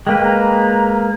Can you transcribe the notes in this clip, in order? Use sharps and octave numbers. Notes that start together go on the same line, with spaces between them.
G#3 A#3 B4 G5
A#5